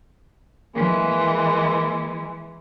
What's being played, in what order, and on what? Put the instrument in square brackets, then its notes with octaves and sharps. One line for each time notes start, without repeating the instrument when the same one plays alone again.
[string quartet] E3 G#3 [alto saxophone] A#3